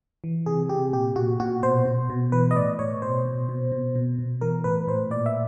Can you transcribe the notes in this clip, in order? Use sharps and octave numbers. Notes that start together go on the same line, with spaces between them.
E3
C3 G#4
C3 G4
A#2 G4
A#2 F#4
A#2 F#4
B2 C5
B2
B2
E3 B4
D#5
A2 D5
A2 C#5
B2 C5
B2
B2
B2
B2
B2
E3 A#4
A2 B4
A2 C5
A#2 D5
E5